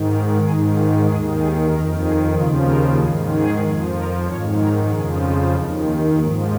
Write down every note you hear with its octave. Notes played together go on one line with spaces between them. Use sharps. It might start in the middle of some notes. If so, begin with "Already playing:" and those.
Already playing: G#2 D#3
A#4
G#2 D#3 G#4
F4
D#2 D#3 G#4
G#4
F2 D#3 A#4
G#4
D#2 C#3 F3 F4
A#4
G#2 D#3 G#4
G#4
F2 F3
A#4
G#2 D#3 C#5
A#4
F2 C#3 F3 G#4
F4
D#2 D#3 D#4
C#4
G#2 F3 G#3